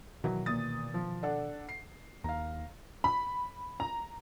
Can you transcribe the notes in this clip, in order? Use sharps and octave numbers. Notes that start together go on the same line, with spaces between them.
B2 D#3 E3 F#3
A#2 D#6 A6
F3
D4 A4 F#5
C7
D#2 F5 A#5
B5
A#5